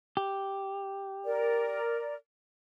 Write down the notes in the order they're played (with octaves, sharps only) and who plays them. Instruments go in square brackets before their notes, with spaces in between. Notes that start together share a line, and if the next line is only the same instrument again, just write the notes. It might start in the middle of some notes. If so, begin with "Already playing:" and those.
[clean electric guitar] G4
[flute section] A#4 D5